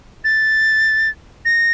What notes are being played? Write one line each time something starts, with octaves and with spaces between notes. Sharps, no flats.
A6
A#6